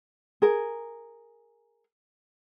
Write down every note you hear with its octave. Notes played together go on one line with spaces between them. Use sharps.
G#4 A#4